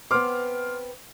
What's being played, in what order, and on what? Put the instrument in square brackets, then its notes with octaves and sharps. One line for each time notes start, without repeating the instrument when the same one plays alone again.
[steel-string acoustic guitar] B3 C4 [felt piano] C6 F6 [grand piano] D6